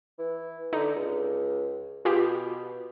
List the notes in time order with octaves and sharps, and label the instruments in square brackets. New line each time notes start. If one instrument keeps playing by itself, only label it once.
[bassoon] E3
[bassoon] D3 [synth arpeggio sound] D#4
[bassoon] C#2
[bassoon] B2 [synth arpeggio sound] F4 G4 G#4